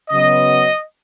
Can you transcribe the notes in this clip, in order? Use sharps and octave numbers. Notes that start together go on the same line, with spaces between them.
C#3 F#3 B3 D#5